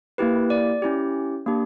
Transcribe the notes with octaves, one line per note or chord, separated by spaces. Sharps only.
A#3 E4 G4 B4
D5
C#4 E4 G4
A#3 D4 G4